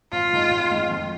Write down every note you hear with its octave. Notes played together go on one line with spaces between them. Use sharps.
G#1 F4
G#2 D#3 G#3
G#1
G#2 D#3 G#3
F2